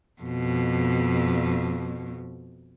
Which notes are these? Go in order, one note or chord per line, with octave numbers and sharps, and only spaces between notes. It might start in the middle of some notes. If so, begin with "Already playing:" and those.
F2 B2